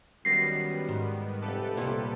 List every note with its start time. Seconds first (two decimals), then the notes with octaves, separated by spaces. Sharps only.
0.25 F#2 D#3 G3 B3 A#6 C7
0.89 G#2
1.41 F1 G4 A4 B4
1.77 C2 A#2